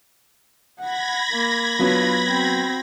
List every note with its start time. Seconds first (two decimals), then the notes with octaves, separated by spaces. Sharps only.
0.80 F#5 B5 G#6 A#6
1.31 A#3
1.79 F#3 B3 D4 F4
2.25 C4 F#4